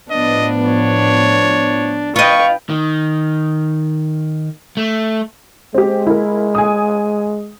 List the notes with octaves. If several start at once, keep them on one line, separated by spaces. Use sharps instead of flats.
A2 F3 B3 D4 D#5
C#5
F4 B4 D#5 G5 C#6
D#3
A3
G#3 C4 G4
E4 A#4
G#5 D#6